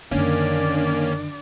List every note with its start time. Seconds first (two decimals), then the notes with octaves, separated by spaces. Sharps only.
0.11 F#2 D3 D#3 A#3 C#4 D4 D5